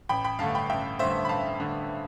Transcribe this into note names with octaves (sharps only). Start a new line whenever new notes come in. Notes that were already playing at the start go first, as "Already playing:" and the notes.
A1 G5 B5
G5 B5
G2 D3 A3 F5 A5
G5 B5
A1 E5 G5
G2 D3 A3 C5 E5
B5
A1 F5 A5
G2 D3 A3